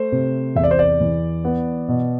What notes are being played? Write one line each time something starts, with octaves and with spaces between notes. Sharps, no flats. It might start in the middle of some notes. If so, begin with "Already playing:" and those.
Already playing: A3 C5
C3
E2 E5
D5
C5
D5
E3
B3
B2